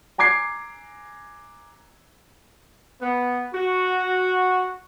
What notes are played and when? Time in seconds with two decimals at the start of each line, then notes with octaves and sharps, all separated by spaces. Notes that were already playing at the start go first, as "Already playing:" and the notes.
0.18 G#5 A#5 D6 G#6 C7
3.01 B3
3.53 F#4